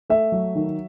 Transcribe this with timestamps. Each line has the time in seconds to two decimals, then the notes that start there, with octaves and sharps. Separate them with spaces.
0.10 A3 E5
0.32 F#3
0.55 D#3